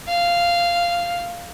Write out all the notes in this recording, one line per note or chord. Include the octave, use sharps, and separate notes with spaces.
F5